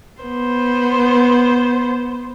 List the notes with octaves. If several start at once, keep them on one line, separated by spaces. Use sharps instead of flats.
B3 C5